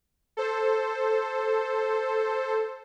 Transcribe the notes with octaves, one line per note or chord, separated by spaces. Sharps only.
A4 C5